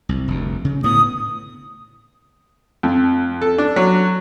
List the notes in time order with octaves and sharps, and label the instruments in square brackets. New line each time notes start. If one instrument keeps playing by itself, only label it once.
[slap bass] C2
F1 D2
C#3
[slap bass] A2 D3 B3 [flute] D#6
[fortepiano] F2
A4
D4
F#3